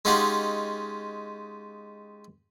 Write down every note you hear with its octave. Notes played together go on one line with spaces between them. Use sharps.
G#3 C#4 D#4 F4 G4 F#5